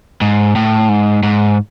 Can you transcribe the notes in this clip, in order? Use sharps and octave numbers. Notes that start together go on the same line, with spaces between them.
G#2
A2
G#2
G#2